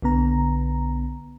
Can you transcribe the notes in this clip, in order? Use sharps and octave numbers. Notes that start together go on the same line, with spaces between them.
B1 D3 B3 A#5